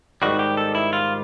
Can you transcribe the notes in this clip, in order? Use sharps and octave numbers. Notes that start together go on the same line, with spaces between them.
G#2 D#3 G3 F#4
G4
A4
E4
F4